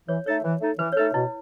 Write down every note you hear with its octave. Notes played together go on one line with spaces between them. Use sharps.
E3 C#5
A3 D#4 A4 C#5
E3
A3 D#4 A4
E3 B4
C#5
A3 D#4 A4 B4
B2 E4